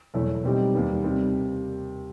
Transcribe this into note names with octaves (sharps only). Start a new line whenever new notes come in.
E2 B2 F#3 A3 E4
B2 G3 C4 D#4 G4
D#2 D#3 G3 B3
C3 D#3 G3 C4